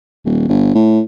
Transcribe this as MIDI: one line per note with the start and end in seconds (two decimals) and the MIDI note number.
0.25 0.45 27
0.48 0.70 31
0.74 1.00 45